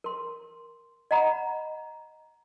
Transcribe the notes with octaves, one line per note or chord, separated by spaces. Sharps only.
A#4 C6
D#5 F#5 A#5 B5